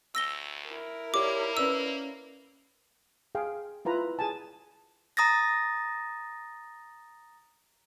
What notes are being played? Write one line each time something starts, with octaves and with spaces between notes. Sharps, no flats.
D2 E6 A#6 G7
E4 A#4
A#3 G4 C#5 D5 D6
C#4 B4 D5 E6
G#4 F5 G5
E4 F4 B4 A#5
G#4 G#5 A5
A#5 D#6 A6 A#6